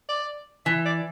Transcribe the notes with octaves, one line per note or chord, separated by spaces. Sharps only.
D5
E3 E5
D5